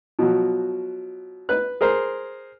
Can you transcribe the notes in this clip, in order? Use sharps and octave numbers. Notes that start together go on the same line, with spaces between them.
B2 F3 F#3
B4 F#6
G#4 A#4 C5